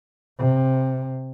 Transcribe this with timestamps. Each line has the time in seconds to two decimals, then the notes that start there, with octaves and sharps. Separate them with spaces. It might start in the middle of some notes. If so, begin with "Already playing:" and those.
0.39 C3